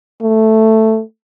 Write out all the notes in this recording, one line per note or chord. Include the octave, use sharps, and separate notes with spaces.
A3